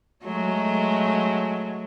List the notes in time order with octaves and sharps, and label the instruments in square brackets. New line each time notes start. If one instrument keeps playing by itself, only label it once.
[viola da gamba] F#3 G#3 A3